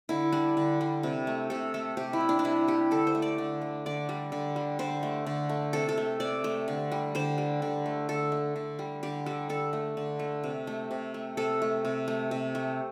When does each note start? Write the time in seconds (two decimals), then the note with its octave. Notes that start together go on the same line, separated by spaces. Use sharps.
0.09 D3 E4
0.32 G3 D4
0.57 D3
0.81 G3
1.03 C3
1.27 A3
1.50 C3 A4
1.74 A3 A4
1.97 C3 G4
2.13 E4
2.20 G3
2.29 D4
2.39 D4
2.45 C3 E4
2.68 G3 G4
2.91 D3 A4
3.07 C5
3.15 A3
3.22 D5
3.38 D3
3.61 A3
3.86 D3 D5
4.09 G3
4.32 D3
4.56 G3
4.79 D3 C5
5.03 A3
5.27 D3
5.49 A3
5.73 C3 A4
5.89 A4
5.97 A3
6.20 C3 D5
6.44 A3
6.68 D3
6.91 G3
7.15 D3 C5
7.38 G3
7.62 D3
7.86 A3
8.09 D3 A4
8.32 A3
8.56 D3
8.79 G3
9.03 D3 G4
9.26 G3 A4
9.49 D3 A4
9.73 A3
9.97 D3
10.19 A3
10.44 C3
10.67 A3
10.91 C3
11.14 A3
11.37 C3 A4
11.62 A3
11.85 C3
12.08 A3
12.31 C3
12.55 A3